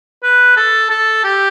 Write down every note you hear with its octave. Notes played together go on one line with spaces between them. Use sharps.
B4
A4
A4
G4